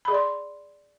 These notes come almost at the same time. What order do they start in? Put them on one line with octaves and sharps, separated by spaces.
B5 G#4 D5 C6